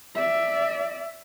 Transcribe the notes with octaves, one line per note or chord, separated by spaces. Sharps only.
D5 E5